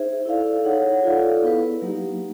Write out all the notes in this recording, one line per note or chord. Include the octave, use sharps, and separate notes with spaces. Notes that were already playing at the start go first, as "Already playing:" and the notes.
Already playing: D#4 G#4 C5 E5
E4 A4 D5 F5
D#4 G#4 C#5 F#5
F4 A4 D5 F5
B3 E4 G#4 B4
F#3 A#3 D#4 G4